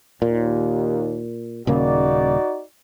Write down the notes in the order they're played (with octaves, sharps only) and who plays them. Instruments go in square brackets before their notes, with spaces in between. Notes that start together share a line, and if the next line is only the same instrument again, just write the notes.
[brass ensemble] D#2 [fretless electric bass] A#2
[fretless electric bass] D#1 C#3 A#3 [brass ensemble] D#4 F#4 D5